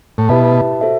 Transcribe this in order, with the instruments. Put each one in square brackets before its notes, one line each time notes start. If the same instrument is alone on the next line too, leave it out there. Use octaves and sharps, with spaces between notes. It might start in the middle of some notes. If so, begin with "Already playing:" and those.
[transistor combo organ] A2
[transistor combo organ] B2 [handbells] E4 G4 B4 E5 A5
[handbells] F#4 A4 C5 E5